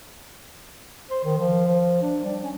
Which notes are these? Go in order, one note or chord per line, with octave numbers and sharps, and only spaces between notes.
C5
D#3
F3
F3
D4
G3
C#4